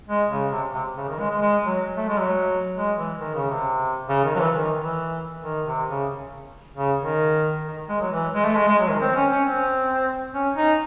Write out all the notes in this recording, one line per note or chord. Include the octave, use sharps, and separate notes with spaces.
G#3
C#3
C3
C3
C#3
D#3
G#3
G#3
G#3
F#3
A3
G#3
F#3
G#3
E3
D#3
C#3
C3
C#3
D#3
F#3
E3
D#3
E3
D#3
C3
C#3
C#3
D#3
D#3
G#3
F#3
E3
G#3
A3
G#3
G#3
F#3
D#3
C4
C#4
C#4
C4
C#4
D#4